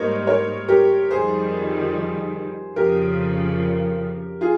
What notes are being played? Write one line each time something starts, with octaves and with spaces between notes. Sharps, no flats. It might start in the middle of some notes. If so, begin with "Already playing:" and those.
Already playing: G#2 G3 A#3 A#4 C5 C#5 D#5
A#4 C#5
G4 A#4
F2 D#3 G3 G#4 C5
F2 C#3 F3 G4 A#4
F4 G#4